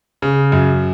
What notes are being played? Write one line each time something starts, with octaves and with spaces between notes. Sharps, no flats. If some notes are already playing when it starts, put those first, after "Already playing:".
C#3
F#2